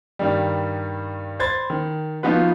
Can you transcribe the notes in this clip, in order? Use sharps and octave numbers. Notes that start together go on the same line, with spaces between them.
G2 D#3 G3
C5 B5 C6 G#6 A6
D#3
F3 B3 D#4 F4 F#4 B4